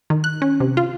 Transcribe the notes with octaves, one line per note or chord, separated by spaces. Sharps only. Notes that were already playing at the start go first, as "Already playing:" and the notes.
D#3
F#6
C#4
C3
F4